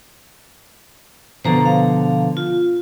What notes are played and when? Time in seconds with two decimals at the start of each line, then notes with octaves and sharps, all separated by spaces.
1.45 B2 D3 F3 C5 A#5
1.65 F5
2.37 F4